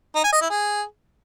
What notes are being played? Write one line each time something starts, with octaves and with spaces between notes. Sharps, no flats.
D#4
G#5
D#5
E4
G#4